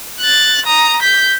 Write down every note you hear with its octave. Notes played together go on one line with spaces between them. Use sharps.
F#6 A6
A#5 D#6
G6 B6